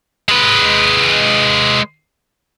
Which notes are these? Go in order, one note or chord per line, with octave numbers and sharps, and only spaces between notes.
G#3 B4